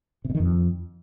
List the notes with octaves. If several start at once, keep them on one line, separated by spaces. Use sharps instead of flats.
C3
B2
D#3
F2